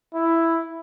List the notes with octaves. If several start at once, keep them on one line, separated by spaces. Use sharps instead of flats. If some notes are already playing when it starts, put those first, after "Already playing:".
E4